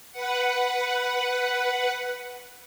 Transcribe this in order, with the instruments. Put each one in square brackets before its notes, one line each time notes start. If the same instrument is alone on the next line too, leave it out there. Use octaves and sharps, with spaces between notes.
[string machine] B4 F#5